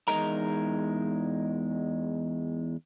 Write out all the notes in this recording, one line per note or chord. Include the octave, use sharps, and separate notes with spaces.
E2 G#3 D#4 A#4 A#5